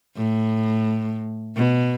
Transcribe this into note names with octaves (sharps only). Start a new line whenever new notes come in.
A2
B2